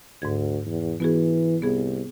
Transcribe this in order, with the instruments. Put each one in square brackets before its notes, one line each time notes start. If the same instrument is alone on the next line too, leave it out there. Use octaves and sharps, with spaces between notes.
[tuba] D2 [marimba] G#2 G#6
[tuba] E2
[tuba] E3 [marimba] B3 F#4 G#4
[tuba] C2 [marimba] B3 G#4